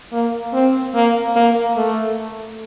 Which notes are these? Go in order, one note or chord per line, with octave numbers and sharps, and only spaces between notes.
A#3
C4
A#3
A#3
A3